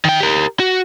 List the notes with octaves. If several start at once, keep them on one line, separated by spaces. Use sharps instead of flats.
D#3 G5
G4 A#4
F#4